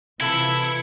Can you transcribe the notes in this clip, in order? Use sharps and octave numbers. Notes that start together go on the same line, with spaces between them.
C3 E3 E4 F4 A4 B5 G#6 C#7